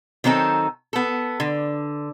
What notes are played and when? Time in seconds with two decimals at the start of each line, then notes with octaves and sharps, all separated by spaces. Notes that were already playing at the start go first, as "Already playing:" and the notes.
0.24 D#3 F#3 C4 D#4 A4
0.93 B3 A4
1.40 D3